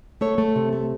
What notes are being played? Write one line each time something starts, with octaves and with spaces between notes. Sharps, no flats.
A3 A4 C#5
A3
C3
A3